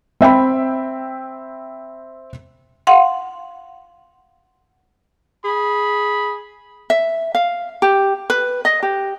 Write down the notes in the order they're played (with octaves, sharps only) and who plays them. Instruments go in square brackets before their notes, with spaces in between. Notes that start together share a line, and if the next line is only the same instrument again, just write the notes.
[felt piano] C4 E5 G5 B5
[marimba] F5 F#5 C6
[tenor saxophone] G#4 [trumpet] B5
[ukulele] E5
F5
G4
B4
D#5
G4